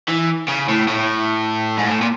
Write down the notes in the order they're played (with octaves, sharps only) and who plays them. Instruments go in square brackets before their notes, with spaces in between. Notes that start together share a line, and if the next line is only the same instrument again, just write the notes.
[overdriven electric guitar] E3
C#3
A2
A2
G#2
A2
A#2